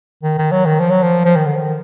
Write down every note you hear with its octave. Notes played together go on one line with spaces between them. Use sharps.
D#3
D#3
F#3
D#3
F3
F#3
F3
F3
D#3
D3
D#3